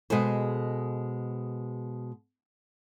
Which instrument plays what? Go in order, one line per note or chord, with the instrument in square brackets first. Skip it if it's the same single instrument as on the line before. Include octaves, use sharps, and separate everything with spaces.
[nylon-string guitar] B2 G#3 G#4 A4 C5